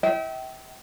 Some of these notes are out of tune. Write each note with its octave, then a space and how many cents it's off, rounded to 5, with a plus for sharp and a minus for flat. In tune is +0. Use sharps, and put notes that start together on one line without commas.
E5 -35 G5 -30